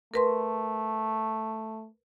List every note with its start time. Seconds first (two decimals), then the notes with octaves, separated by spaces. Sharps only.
0.14 A3 A#4 B4 C6